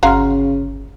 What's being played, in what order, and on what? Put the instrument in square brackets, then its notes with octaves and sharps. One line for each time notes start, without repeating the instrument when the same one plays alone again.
[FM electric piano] G1 [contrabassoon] C#3 [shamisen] F#4 F5 [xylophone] A#5 C6 F6